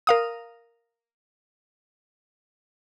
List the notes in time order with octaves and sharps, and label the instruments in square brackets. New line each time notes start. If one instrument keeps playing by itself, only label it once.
[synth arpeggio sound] A#4 F5 D#6